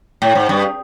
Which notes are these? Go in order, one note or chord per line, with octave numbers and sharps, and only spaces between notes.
A2
G#2
G2